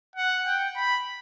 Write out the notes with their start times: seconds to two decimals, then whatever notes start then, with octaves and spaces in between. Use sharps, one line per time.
0.16 F#5
0.46 G5
0.76 B5